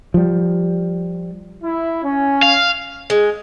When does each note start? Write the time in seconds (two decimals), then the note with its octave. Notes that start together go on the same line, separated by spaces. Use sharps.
0.14 F3 G3
1.62 E4
2.03 C#4
2.42 F5
3.10 G#3